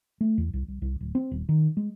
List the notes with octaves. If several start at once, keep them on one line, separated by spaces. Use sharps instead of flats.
A3
E2
C2
C2
C2
D1
C4
D#1
D#3
G#3